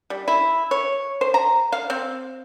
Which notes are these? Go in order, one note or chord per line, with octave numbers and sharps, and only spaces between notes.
G3
E4
C#5
C5
A#5
F5
C4